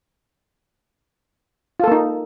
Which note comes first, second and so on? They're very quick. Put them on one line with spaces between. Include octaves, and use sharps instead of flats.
F4 A4 A#3 D#4